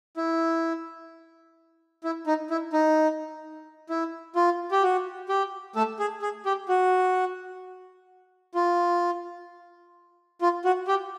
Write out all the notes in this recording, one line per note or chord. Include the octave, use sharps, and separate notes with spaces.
E4
E4
D#4
E4
D#4
E4
F4
G4
F#4
G4
A3 A4
G#4
G#4
G4
F#4
F4
F4
F#4
G4